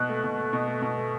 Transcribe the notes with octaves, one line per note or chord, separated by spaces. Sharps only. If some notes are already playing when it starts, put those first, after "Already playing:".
Already playing: B2 F#6
A3
B2
A3
B2
A3
B2
A3